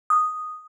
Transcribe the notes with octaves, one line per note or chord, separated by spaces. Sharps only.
D#6